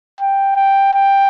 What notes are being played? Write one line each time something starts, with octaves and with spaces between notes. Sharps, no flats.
G5
G5
G5